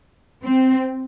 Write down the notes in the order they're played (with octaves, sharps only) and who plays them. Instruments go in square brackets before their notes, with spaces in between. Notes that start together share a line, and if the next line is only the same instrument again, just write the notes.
[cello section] C4